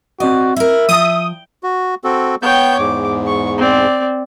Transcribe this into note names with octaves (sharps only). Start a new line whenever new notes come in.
C4 F#4 D5 D#5
E4 A#4 E5
F3 G5 A5 D#6
F#4
C4 F#4 A4
B3 C#5 G5 G6
E2 G#2 D6
C#6
C4 D5